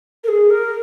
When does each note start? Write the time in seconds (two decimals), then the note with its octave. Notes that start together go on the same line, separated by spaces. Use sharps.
0.24 A#4
0.28 G#4
0.50 A#4